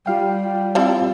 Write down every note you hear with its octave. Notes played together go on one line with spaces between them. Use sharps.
G3 F4 F5 G5
F3 G3 C4 E4